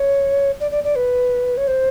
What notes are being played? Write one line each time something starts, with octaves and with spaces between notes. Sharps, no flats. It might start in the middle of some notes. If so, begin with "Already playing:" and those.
Already playing: C#5
D5
D5
D5
B4
C#5
C5